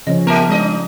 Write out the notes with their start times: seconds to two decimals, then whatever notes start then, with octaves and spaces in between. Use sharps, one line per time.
0.07 C#3 F3 C#4 D#5
0.27 G3 B3 G4 A#4 E5 A5 A#5
0.50 G#2 G#3 D4 D#5